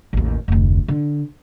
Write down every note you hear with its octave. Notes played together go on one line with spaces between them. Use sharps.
A1 D#2
F1 D2
D3